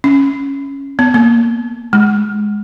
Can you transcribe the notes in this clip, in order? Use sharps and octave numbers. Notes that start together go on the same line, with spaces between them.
C#4
B3
A#3
G#3